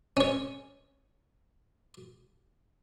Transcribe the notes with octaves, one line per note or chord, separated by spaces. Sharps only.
C#4 C#5